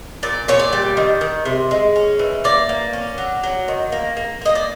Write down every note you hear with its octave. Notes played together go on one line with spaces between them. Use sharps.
A#2 D5
A#2 C#5
D5
G3
D#3
D#3
C3
G#3
C#4
E3
A#3 D5
A#3
C#4
F#3
F#3
D#3
A#3
A#3
A#3 D#5
D5